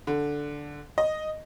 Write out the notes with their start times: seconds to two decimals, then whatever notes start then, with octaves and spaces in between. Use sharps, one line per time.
0.07 D3
0.98 D#5